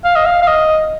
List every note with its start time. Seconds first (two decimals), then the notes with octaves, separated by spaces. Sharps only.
0.04 F5
0.16 D#5
0.26 F5
0.42 F5
0.47 D#5